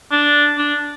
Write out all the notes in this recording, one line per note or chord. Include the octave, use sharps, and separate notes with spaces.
D4
D4